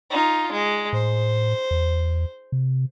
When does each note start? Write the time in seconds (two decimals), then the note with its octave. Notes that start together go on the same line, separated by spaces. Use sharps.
0.10 D#4 F4
0.52 G#3
0.93 A2 C5
1.71 E2
2.52 C3